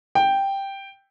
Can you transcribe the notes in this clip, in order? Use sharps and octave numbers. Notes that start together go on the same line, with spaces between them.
G5